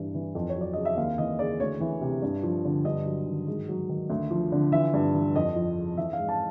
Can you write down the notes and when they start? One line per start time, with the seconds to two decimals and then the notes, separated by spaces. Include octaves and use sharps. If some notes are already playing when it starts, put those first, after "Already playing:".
Already playing: G2 E3
0.14 E3
0.35 F2
0.49 C#5
0.56 F#3
0.61 D5
0.73 C#3 D#5
0.85 E5
0.97 D#2 F5
1.18 E3 D#5
1.39 C#3 D5
1.60 D2 C#5
1.80 E3
2.01 C3
2.22 G2
2.43 F3
2.65 D3
2.85 G2 D#5
3.06 F#3
3.27 D#3
3.47 G#2
3.69 F#3
3.89 D#3
4.10 D2
4.31 F3
4.52 D3
4.72 E3 E5
4.94 G2
5.14 E3
5.35 F2 D#5
5.56 F3
5.77 C#3
5.97 E3 E5
6.13 F5
6.18 G#2
6.29 A5